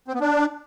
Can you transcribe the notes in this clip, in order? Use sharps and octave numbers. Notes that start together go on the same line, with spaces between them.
C4
B3
D4